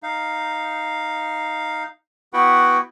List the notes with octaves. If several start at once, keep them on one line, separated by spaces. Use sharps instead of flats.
D#4 F5
B3 E4 F#4 B4 F#5 G5